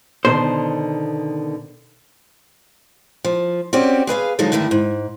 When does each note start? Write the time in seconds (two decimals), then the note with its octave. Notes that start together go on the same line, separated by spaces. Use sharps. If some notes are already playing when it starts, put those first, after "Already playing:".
0.25 B2 D3 D#3 C5
3.24 F3
3.73 C4 C#4 F#4 G4 D5
4.07 G#4 B4 D#5 F5
4.39 D#3 F3 F#3 G#3 D#4 A4
4.52 G2 D3 D#3 A3 E4
4.71 G#2